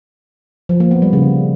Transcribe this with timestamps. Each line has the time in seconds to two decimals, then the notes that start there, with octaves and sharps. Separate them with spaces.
0.69 F3
0.80 A#3
0.91 B3
1.02 G3
1.13 C#3